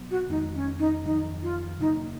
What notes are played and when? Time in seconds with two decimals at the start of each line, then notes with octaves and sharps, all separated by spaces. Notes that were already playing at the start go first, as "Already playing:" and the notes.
Already playing: B2 F#3 B3
0.11 F#4
0.29 F2 D#3 G#3 B3 D#4
0.55 C#4
0.79 D#4
1.04 F2 D#3 F#3 D#4
1.43 F4
1.80 F#2 C#3 F#3 A#3 D#4